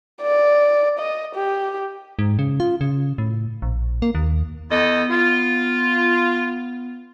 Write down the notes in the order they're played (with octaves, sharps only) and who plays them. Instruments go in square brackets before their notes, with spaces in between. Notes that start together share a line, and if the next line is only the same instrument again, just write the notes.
[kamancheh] D5
D#5
G4
[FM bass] G#2
C#3
F4
C#3
A2
A#1
A#3
D#2
[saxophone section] E2 A4 D#5 [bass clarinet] B3
[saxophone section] F4